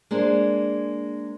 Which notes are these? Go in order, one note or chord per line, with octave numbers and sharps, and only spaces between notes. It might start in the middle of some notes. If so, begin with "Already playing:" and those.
G#3 A#3 D4 G#4 C5